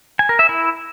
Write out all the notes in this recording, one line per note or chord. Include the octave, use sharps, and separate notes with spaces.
G#5
A#4
E5
E4